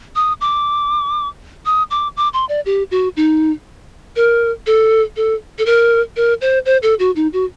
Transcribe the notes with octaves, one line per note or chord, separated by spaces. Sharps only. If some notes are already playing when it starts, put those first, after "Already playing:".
D#6
D6
D#6
D6
D6
C6
D5
G4
F#4
D#4
A#4
A4
A4
A4
A#4
A#4
C5
C5
A4
F#4
D#4
F#4